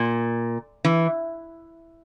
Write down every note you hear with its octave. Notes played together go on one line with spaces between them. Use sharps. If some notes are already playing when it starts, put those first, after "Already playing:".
Already playing: A#2
E3